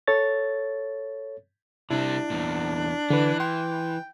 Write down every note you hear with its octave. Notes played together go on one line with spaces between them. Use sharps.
A4 C#5 A6
C3 G3 D4 E4
E2 A#2
D3 E3 B4
G5 C6